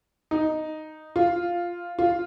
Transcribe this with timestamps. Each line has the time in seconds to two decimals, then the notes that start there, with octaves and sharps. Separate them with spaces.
0.31 D#4
1.16 F4
1.99 F4